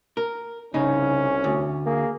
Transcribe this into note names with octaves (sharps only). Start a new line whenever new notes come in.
A#4
C2 C#3 C#4 D#4
D2
A#3 G#4